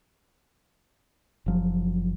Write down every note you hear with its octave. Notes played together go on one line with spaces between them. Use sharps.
F#1 F3 F#3